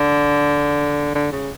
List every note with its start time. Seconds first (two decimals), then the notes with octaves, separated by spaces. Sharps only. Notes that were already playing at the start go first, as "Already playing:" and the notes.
Already playing: D3
1.15 D3
1.32 C#3